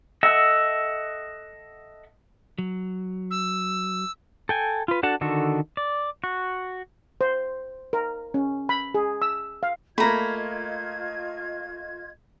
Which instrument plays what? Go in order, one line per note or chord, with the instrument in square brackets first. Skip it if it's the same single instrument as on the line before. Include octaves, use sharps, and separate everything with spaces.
[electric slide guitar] A4 D#5 E5 F#5
[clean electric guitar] F#3
[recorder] E6
[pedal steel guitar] A4 G5 G#5
F4 B4
D4 F#4 A4 F#5 A5
D3 D#3 F#4 A4
D5
F#4
[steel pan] C5
A#4
C#4
B5
G#4
E6
F5
[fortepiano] A3 A#3 [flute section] F4 D#5 G#6 [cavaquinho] A#5 B5